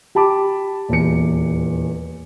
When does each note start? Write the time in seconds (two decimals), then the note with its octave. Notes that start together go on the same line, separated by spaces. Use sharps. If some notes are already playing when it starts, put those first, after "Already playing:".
0.15 G4 A5 B5 D6
0.89 D#1 E2 C#7